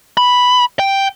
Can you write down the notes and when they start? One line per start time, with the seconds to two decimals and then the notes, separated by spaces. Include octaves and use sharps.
0.17 B5
0.79 G5